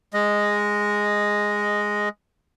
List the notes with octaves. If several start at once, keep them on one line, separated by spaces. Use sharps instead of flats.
G#3 D#5